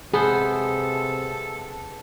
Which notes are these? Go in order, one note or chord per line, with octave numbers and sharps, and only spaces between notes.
C3 B3 G#4 A4 C5